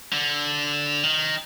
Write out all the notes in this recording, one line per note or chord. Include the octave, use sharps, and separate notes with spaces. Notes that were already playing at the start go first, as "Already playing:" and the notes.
D3
D#3